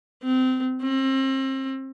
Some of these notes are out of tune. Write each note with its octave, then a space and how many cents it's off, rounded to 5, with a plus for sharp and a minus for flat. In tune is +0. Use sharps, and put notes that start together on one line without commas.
C4 -25
C4 +30